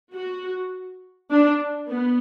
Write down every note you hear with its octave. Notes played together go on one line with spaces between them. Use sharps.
F#4
D4
B3